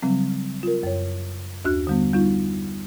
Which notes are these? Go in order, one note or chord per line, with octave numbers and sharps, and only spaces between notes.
C#3 F#3 G3 C4
F4 A#4
F#2 C#5
D#2 D4 F#4 F#6
D3 G3 B3
G3 D#4 F4